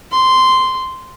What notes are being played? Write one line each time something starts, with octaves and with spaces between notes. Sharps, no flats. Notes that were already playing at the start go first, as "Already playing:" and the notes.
C6